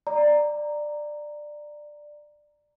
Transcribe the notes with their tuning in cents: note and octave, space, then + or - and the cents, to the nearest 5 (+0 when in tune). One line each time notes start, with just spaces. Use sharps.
D5 +15 A#5 -5